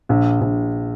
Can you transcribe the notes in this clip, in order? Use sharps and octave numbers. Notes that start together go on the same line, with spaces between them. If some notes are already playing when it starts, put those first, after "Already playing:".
A#1
A#1